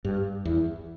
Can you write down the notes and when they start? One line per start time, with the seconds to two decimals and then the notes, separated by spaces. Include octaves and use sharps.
0.04 G2 G4
0.45 E2 E4